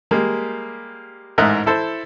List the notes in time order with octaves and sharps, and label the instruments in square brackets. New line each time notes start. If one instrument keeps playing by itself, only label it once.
[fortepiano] G3 G#3 A#3
A1 G#2 A#4 D#5 E5 F#6
E4 A4 C5